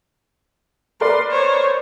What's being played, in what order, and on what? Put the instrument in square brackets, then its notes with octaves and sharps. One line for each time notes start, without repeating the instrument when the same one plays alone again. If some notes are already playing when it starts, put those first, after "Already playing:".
[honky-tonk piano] A#4 B4 D5 [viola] C6
[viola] C5 C#5